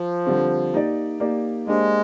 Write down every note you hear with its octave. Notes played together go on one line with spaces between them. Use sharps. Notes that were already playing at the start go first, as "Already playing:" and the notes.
Already playing: F3
D3 G3 C4 G4
A#3 D#4 G4 D5
A#3 D#4 G4 D5
G#3 A#3 D4 G4 C5